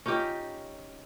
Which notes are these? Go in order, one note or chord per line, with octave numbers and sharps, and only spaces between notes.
C#4 D#4 F4 G4